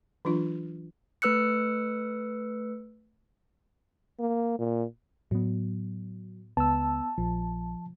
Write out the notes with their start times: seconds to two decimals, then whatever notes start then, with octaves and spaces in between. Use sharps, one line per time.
0.25 E3 F#3 D4 F4
1.22 A3 B4 E6 F#6 C#7
4.20 A#3
4.59 A#2
5.31 A2 F#3 B3
6.57 C#2 B3 A5 E6
7.18 A#1 F3